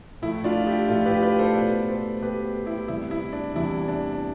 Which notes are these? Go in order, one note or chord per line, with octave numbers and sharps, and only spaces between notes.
A2 F3 A3 E4
D4 F4
E4 G4
A2 F3 A3 F4 A4
G4 B4
B4 D5
A4 C5
B2 A3 B4 D5
A4 C5
B2 A3 G4 B4
E4 G4
E2 C3 E3 G3 E4
E4
D4
E2 C3 E3 G3 E4
D4